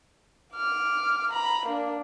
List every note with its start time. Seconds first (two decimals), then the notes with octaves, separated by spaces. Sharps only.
0.54 D6 F6
1.31 A#5 B5
1.66 A#3 D4